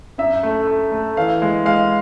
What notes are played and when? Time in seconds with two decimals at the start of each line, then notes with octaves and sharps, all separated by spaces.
0.18 F#2 E5
0.43 A3
0.67 A3
0.92 A3
1.17 E3 F5
1.42 G#3
1.65 G#3 F5